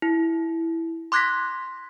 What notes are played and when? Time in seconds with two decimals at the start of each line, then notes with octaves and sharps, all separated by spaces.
0.02 E4
1.12 C6 D6 F#6 G#6 A#6 B6